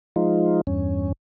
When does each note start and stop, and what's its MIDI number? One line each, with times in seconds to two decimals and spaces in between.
0.16 0.61 53
0.16 0.61 56
0.16 0.61 63
0.16 0.61 65
0.67 1.12 40
0.67 1.12 43
0.67 1.12 61